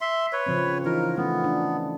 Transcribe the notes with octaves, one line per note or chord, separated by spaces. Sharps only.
E5 C6
B4 C#5
C#3 F3 C4
E3 D#4 F4 A#4
A3 B3 C#4
D4